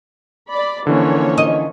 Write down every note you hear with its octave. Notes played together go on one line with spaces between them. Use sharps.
D5 B5
D3 E3 F3 A#3 C#4 C#5
D#5